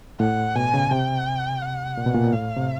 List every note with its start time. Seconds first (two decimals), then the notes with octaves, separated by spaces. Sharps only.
0.20 A2 F#5
0.56 B2 G#5
0.74 C#3
0.91 C3 G5
1.62 F#5
1.97 A#2
2.06 B2
2.15 A#2
2.33 A2 F5
2.57 C3